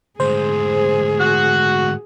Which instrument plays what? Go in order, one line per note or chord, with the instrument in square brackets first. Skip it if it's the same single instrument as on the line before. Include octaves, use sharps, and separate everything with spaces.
[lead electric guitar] D2 G#2 [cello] G#4 [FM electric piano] C5
[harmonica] F#4 F#5